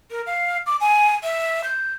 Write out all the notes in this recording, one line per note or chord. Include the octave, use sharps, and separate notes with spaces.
A#4
F5
D6
G#5
E5
G6